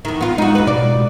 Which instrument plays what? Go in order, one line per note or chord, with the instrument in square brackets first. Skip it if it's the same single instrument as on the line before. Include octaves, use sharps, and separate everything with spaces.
[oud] E2 D#3
B3 F4
[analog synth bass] G#3 [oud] D#4 F#4
[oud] D#2 B4
[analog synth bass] B2 [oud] D5